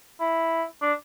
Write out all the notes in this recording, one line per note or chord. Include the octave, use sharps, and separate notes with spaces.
E4
D4